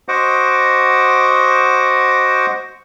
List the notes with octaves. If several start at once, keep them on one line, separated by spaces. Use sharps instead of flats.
F#4 C5 D#5 F#5 D6